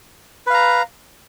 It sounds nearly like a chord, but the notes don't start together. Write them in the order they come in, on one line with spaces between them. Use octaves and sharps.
B4 F5 A#5